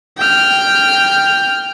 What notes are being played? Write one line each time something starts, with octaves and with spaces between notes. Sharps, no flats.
G5 F6